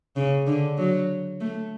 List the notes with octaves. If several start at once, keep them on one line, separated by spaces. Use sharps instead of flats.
C#3
D3
F#3
A3